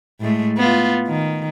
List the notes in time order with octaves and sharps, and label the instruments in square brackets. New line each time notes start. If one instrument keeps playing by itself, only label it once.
[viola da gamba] A2 G#3 A3
B3 F4
D#3